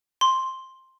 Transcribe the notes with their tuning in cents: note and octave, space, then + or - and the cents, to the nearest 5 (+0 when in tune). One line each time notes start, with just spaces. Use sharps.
C6 +5